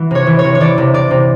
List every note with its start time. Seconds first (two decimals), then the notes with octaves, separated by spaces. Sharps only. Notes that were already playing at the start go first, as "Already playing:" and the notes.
Already playing: E3 F#5
0.11 C3 C#5
0.27 E3
0.39 C#5
0.44 C3
0.55 C#5
0.60 E3 D5
0.78 C3
0.94 C3 D5
1.11 C3